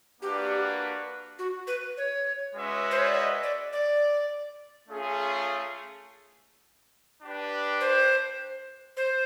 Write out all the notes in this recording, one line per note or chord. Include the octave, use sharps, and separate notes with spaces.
A#3 D4 F#4 G4 B4 D5
F#4
B4
C#5
G#3 C#4 F#4 B4 E5
C5
C#5
D5
D#5
D5
D5
A3 C#4 F4 G#4
D4 G4 B4
C5
C5